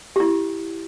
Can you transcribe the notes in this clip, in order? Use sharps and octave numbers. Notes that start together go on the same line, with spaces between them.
E4 G4